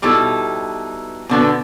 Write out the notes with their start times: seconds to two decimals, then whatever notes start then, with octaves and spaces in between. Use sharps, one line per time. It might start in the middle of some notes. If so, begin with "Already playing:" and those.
0.02 B2 G3 D#4 E4 A4
1.29 B2 D3 B3